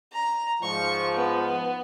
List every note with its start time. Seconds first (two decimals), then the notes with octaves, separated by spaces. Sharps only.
0.13 A#5
0.63 G#2 F3 C#6
1.16 B3